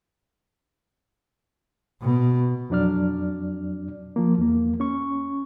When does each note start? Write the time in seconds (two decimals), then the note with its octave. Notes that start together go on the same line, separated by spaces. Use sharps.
2.01 B2
2.70 F2 F#3 D4 D5 F6
4.16 F3 A#3
4.38 E2 A#3
4.80 C#4 C#6